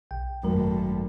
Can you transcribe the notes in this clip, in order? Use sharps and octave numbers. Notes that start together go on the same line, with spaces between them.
B1 G5
G#1 F#2 F#3 A3 A#4